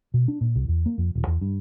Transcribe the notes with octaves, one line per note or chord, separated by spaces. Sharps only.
B2
D4
A#2
C2
E2
A#3
F2
D#1
E2
G2